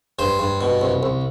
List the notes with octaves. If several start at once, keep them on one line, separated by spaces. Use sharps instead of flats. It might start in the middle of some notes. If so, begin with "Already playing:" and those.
G2 C5
G2
B2
C2
C2